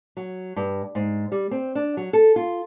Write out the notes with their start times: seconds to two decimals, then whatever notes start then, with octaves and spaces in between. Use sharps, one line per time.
0.17 F#3
0.56 G2
0.95 G#2
1.32 G3
1.51 C4
1.75 D4
1.97 F#3
2.13 A4
2.36 F4